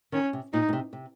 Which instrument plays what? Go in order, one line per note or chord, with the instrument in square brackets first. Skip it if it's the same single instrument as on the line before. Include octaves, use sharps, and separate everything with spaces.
[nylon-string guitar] D#3 [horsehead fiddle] C#4
[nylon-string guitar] C3
[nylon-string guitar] A#2 [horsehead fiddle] D#4
[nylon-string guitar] A#2
C3
C3